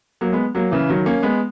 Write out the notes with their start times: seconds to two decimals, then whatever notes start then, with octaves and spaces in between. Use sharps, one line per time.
0.21 F#3 A#3
0.32 G#3 B3
0.55 F#3 A#3
0.71 C#3 E3
0.89 D#3 F#3
1.06 A#3 C#4
1.23 G#3 B3